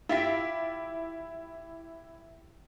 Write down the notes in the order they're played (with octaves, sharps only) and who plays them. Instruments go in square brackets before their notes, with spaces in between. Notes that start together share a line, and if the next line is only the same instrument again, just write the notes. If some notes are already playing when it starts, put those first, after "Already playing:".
[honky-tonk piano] E4 B6 [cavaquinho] F4 G4 E5